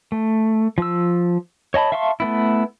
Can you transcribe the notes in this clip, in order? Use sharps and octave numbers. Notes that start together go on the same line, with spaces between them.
A3
F3 E6
C#5 D#5 A5 B5
E5 F5 A5 C6 C#6
A3 B3 E4